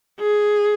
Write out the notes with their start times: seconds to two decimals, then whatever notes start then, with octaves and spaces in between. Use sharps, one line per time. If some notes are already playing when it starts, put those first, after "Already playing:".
0.20 G#4